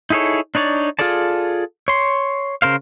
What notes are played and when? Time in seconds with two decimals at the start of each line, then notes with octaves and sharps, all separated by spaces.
0.10 D#4 E4 G#4 A4 C#5
0.55 D4 D#4 C#5 D5
0.99 F4 G#4 A4 D5 A5
1.88 C#5 C6
2.62 C#3 A#4 C5 F5